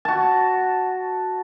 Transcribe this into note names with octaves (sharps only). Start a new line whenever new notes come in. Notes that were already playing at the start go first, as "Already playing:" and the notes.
F#4 A5